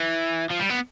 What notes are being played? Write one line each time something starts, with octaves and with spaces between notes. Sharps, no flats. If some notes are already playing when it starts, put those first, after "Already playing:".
Already playing: E3
F3
G3
B3